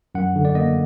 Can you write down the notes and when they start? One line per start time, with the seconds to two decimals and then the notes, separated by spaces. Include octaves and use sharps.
0.15 F#2 F#5
0.35 D3
0.45 D5
0.55 A#3 D#5